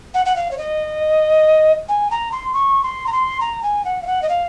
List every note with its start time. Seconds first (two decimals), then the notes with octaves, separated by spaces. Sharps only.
0.14 F#5
0.26 F#5
0.36 F5
0.51 C#5
0.58 D#5
1.88 G#5
2.11 A#5
2.32 C6
2.53 C#6
2.83 C6
3.07 A#5
3.12 C6
3.41 A#5
3.63 G#5
3.85 F#5
4.02 F5
4.07 F#5
4.22 D#5
4.29 F5